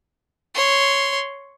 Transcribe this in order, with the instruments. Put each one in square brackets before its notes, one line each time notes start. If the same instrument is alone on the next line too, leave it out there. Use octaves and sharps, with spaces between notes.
[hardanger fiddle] C#5 C6